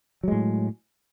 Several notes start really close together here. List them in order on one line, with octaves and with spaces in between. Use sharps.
F#3 G#3 A2